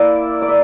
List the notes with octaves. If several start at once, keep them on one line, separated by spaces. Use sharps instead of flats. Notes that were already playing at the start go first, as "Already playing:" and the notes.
Already playing: A#3 E4 D5 E5
D5
E5